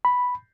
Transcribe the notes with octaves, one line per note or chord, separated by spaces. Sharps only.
B5